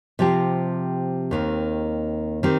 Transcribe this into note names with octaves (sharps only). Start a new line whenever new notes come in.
C3 F3 C4 G4
D#2 D#3 C4
D#3 C4 G4